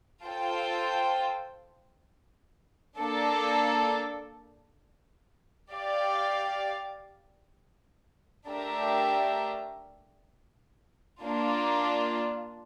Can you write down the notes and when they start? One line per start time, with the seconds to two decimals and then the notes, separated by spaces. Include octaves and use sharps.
0.25 F4 A4 C5 G5
2.99 A#3 D4 A4
5.73 G4 D5 F5
8.48 A3 D4 G4 A#4 E5
11.23 A#3 D4 F4